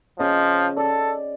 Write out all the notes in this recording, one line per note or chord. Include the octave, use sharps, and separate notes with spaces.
C#3 F3 D#5
A4 D5